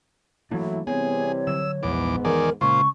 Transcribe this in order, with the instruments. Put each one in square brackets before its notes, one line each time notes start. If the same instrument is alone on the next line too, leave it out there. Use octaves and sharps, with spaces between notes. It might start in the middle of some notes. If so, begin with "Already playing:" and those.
[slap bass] E3 A#3 D4 [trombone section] F#3 A3 E4
[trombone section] C3 E3 G3 [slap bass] B3 C4 [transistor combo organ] G#4 [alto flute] C#5
[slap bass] D3 F#3 [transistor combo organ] E6
[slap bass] A#1 [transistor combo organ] E2 D6 [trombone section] G#2 B3
[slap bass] E1 E3 [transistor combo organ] D#3 G#4 D5 [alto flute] A#4
[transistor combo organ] A#2 F4 C5 [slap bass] C#3 G#3 C#4 [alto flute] C#6